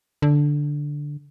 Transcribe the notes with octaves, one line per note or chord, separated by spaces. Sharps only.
D3